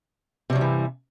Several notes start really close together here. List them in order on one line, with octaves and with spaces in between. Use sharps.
C3 G3 F#3 G2 E3